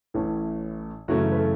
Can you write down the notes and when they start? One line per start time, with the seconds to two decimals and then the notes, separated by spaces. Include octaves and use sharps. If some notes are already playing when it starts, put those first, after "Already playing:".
0.14 A1 A2 E3 C#4
1.08 F#2 C#3 E3 A3 C#4 F#4
1.31 B4
1.38 A4